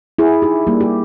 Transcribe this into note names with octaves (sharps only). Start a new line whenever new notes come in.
E4 G#4
D#4 G4
G3 A#3
G4